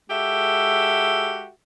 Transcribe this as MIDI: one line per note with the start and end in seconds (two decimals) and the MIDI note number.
0.10 1.49 56
0.10 1.49 66
0.10 1.49 67
0.10 1.49 69
0.10 1.49 76